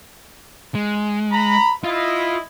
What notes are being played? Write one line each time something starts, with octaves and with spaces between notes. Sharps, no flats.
G#3
A#5 B5
E4 F4 D#5